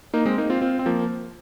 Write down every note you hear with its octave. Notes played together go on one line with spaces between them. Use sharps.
A#3 D#4
G#3 C4
A#3 D#4
C4 F4
C4 F4
C4
F3 A#3